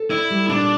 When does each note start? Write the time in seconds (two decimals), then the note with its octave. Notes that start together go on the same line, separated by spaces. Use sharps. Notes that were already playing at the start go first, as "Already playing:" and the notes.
Already playing: A4
0.10 E4 D5
0.30 G3
0.49 A#2 D4